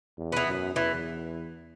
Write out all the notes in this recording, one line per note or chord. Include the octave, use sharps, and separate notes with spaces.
E2
E3 B3
F#2
E2 E3